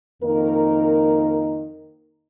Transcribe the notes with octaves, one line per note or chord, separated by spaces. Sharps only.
F2 D#3 A#3 D#4 A#4